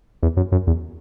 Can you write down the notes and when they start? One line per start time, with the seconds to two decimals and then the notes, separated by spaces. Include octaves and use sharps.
0.23 E2
0.37 F#2
0.52 F#2
0.67 E2